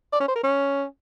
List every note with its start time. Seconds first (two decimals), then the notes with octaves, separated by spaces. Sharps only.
0.13 D5
0.20 C#4
0.28 C5
0.36 A#4
0.43 C#4